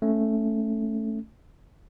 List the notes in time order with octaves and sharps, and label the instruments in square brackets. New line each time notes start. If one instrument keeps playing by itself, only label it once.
[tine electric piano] A3 C#4